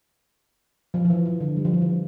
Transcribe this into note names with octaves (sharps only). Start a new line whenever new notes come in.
F3
F3
E3
E3
D3
G3
F3
E3
F3